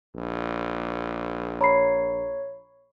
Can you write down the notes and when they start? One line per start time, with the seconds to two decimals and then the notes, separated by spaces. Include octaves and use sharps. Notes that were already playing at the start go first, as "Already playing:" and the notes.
0.15 A#1
1.61 C#5 A#5 B5 C7